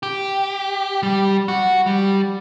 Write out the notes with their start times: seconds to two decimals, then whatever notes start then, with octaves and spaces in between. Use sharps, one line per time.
0.03 G4
1.03 G3
1.48 F#4
1.86 G3